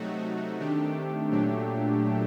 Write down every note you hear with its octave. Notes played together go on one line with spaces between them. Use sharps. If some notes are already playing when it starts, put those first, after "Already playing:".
Already playing: C3 F#3 A3 D#4 F#4
C3 D#3 A3 D4 G4
A#2 F#3 A3 D4 G4